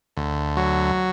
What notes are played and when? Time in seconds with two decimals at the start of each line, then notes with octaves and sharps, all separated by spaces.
0.17 D2
0.57 F#3